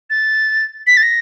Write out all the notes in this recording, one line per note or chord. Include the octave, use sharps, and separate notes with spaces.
A6
B6
A6
A#6